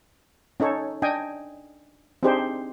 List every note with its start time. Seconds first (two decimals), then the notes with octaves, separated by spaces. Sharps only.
0.60 C#4 D#4 A4 C#5
1.02 D4 D#5 G5 G#5
2.23 C4 D4 D#4 G4 G#4 C5